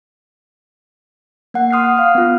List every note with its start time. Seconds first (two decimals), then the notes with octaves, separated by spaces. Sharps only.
1.54 A#3 F#5
1.71 C6 D#6 F6 F#6 C7
1.84 F#5
1.97 F5 F6
2.15 B3 F4